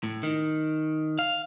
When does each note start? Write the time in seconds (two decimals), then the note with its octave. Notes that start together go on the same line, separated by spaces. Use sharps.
0.03 A2
0.23 D#3
1.19 F5